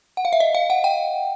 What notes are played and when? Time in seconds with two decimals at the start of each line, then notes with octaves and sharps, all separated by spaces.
0.17 F#5
0.25 F5
0.33 E5
0.40 D#5
0.55 F5
0.70 F#5
0.84 G5